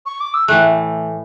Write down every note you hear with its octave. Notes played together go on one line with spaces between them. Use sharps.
C#6
D6
E6
A2 E3 A3 F#6